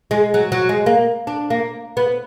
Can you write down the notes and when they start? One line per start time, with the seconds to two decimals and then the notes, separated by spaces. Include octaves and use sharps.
0.11 G#3
0.34 F#3
0.52 F#3
0.69 G#3
0.86 A#3
1.27 D4
1.50 A#3
1.97 B3